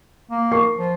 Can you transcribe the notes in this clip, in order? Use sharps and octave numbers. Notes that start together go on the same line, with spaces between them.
A#3
A#4 C#6 C7
F3